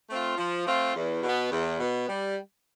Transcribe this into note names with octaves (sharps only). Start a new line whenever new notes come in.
A3 C4 F4
F3
A3 C4 F4
E2
B2 B3
E2
B2 B3
G3